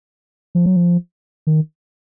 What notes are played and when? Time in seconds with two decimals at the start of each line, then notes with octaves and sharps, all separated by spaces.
0.55 F3
0.66 F#3
0.76 F3
1.47 D#3